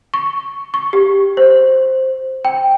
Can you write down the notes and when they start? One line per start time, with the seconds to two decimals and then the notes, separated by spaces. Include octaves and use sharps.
0.14 C#6
0.74 C#6
0.93 G4
1.37 C5
2.45 G5